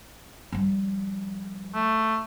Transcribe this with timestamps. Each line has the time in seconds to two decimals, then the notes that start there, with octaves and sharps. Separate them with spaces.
0.52 F3 G3
1.74 A3